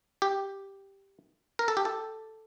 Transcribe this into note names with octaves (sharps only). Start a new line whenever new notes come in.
G4
A#4
A4
G4
A4